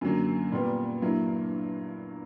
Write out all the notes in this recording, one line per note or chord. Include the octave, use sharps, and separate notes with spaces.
F#2 D3 F#3 A#3
A#2 G3 B3
G2 F#3 A#3 E4